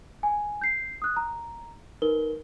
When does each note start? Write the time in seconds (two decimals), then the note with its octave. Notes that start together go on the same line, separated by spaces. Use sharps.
0.23 G#5
0.61 G6 C7
1.02 D#6 F#6
1.16 A#5
2.02 D#4 A#4 B4 G7